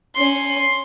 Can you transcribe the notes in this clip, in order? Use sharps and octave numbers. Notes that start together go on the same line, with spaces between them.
C#4 C6